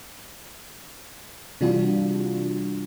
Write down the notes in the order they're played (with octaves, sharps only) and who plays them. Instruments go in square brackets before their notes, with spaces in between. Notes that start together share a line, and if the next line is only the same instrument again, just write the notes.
[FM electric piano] C3 E3 G3 D4 F4 F#4